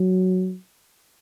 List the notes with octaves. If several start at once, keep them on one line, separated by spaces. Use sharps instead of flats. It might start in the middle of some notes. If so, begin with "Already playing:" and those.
Already playing: F#3